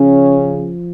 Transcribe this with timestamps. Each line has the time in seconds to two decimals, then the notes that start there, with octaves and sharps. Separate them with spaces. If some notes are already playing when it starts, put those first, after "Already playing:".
Already playing: C#3 F3 C#4